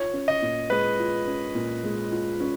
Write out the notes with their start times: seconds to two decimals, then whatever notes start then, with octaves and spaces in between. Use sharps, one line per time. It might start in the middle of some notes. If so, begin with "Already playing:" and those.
Already playing: F4 C#5
0.13 C#4
0.28 D#5
0.42 A#2
0.70 G#3 B4
0.99 F4
1.27 C#4
1.55 A#2
1.83 G#3
2.12 F4
2.40 C#4